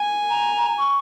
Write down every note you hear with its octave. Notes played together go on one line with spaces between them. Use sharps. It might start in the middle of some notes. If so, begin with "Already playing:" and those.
Already playing: G#5
A#5
C#6